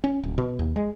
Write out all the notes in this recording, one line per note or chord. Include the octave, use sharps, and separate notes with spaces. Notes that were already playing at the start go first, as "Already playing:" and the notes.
C#4
D1
B2
D#2
G#3